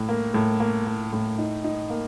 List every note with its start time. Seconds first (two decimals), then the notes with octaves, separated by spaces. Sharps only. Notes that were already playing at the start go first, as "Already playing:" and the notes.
Already playing: A2
0.09 A#3
0.34 A2
0.60 A#3
0.86 A#3
1.12 A2
1.38 D#4
1.64 D#4
1.90 A#3